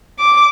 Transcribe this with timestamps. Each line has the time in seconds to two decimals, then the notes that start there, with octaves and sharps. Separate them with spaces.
0.19 D6